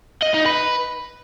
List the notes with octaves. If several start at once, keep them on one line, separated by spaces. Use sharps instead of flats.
D#5
D#4
B4